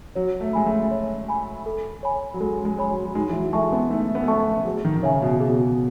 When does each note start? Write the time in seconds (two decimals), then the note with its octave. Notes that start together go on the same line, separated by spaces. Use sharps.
0.15 F#3 C#5
0.41 A3
0.53 G#3 G#5 B5
0.66 A3
0.91 C#5
1.28 G#5 B5
1.66 A4
2.03 C#5 G#5 B5
2.34 F#3
2.40 G#3 A4
2.65 G#3
2.79 C#5 G#5 B5
2.91 F#3
3.06 F#3
3.15 G#3 D#4
3.29 E3
3.34 F#3
3.53 G#3 A4 E5 A5 C#6
3.72 B3
3.90 A3 D#4
4.15 B3
4.23 A3
4.28 B3 A4 E5 A5 C#6
4.40 A3
4.65 F#3 G#4
4.85 D#3
4.97 D#3
5.03 C#3 C#5 E5 G#5
5.22 B2
5.40 G#4
5.48 B2